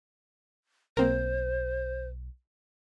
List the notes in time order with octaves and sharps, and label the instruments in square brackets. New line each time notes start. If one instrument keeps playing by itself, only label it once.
[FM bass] B1 [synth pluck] A#3 C4 A#4 [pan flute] C5